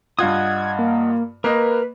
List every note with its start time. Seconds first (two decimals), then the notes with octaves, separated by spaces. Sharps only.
0.19 G2 F4 D#5 F#5 D#6 G#6
0.79 A#3
1.44 A#3 A#4 B4 D#5